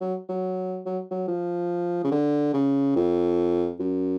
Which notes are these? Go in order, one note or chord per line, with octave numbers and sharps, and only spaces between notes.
F#3
F#3
F#3
F#3
F3
C#3
D3
C#3
F2
F#2